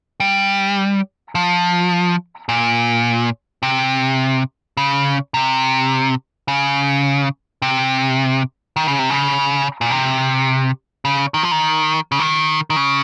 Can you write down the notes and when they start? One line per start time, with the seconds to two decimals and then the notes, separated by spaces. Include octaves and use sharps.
0.20 G3
1.35 F3
2.49 A#2
3.63 C3
4.77 C#3
5.34 C3
6.48 C#3
7.62 C3
8.76 D#3
8.88 C#3
8.99 C3
9.10 C#3
9.81 A#2
9.91 C3
11.05 C#3
11.34 D#3
11.43 F3
11.51 D#3
12.12 C#3
12.19 D#3
12.70 D#3
12.76 C#3